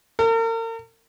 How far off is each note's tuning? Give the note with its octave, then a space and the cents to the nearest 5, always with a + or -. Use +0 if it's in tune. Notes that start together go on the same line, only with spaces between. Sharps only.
A#4 -40